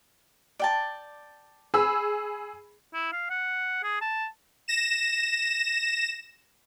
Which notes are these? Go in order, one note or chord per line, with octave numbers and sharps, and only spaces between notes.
D5 G5 A5
G#4 B5 E6
E4
F5
F#5
G#4
A5
A#6 E7